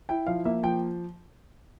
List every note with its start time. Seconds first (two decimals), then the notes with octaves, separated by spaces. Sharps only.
0.09 E4 G5
0.27 F3 F5
0.45 A#3 E5
0.63 F3 G5